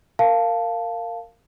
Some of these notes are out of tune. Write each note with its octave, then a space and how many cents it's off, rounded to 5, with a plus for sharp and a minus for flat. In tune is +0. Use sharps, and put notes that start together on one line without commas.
A#4 -15 F5 -5 A5 +0